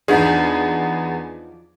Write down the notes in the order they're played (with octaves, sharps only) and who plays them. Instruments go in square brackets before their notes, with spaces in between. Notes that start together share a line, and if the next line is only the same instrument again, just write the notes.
[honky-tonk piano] E2 B3 G#4 [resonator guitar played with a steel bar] F3 D4 D#4